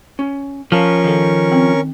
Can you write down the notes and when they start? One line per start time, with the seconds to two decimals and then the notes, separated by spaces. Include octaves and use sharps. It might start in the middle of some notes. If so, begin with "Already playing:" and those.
0.19 C#4
0.72 F3 C#4 A#4 F5 A5 C#6
1.04 D#3 A4
1.52 C4